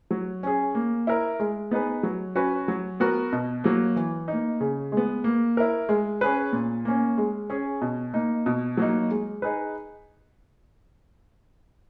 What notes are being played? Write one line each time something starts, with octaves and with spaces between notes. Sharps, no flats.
F#3
C#4 G#4
A#3
E4 A#4
G#3
B3 D#4 G#4 B4
F#3
C#4 F#4 B4
F#3
B3 F#4 A#4
B2
F#3 A#3
E3
A#3 D#4
C#3
G#3 B3
A#3
E4 A#4
G#3
C#4 G#4 B4
A#2
A#3 C#4
G#3
C#4 G#4
B2
A#3 D#4
B2
F#3 A#3 D#4
G#3
D#4 G#4 B4